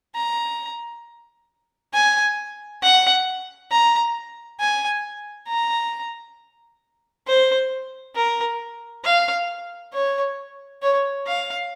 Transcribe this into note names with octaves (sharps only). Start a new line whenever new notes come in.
A#5
G#5
F#5
A#5
G#5
A#5
C5
A#4
F5
C#5
C#5
F5